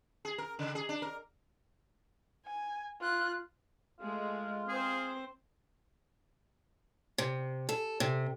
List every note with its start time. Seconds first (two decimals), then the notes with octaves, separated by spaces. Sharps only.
0.25 G#4
0.38 A#4
0.59 C#3
0.75 G#4
0.89 D4
1.02 A#4
2.45 G#5
3.01 F4 F#6
4.00 G#3 A3 F4
4.68 C4 G#4 C5
7.18 C3
7.69 A4
8.00 C3